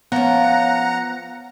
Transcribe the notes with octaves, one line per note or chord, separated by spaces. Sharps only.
F3 B3 C#4 F#5 A#5